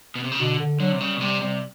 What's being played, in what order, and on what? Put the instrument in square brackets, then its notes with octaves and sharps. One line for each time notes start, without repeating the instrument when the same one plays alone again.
[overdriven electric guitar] B2
C3
C#3
[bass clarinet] B2 [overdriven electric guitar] D3
[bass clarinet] D3
[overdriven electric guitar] D3 [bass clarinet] F#3
[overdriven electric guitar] C3
[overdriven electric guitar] C#3 [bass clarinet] G3
[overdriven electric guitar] B2
[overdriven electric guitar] C3 [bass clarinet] G3
[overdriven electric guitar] C3 [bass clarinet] G3